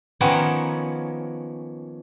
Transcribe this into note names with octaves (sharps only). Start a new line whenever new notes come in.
D#3 F3 A#3 B3 C#4